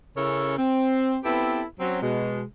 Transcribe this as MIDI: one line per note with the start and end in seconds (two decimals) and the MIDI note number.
0.17 0.56 49
0.17 0.56 61
0.17 0.56 64
0.17 0.56 69
0.17 0.56 70
0.17 0.56 73
0.58 1.16 60
1.24 1.62 59
1.24 1.62 60
1.24 1.62 64
1.24 1.62 67
1.24 1.62 69
1.24 1.62 71
1.80 2.01 54
1.80 2.01 60
1.80 2.01 61
2.02 2.43 47
2.02 2.43 56